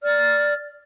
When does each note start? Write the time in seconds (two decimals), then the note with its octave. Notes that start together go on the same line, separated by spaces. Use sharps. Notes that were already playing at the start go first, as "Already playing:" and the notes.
0.02 D5 F6